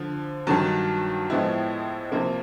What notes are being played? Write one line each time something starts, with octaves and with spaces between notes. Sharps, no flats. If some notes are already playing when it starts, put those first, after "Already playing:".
Already playing: D3 F3
G2 D#3 F#3 A5
A2 F3 G#3 B3 E4
C3 F3 A#3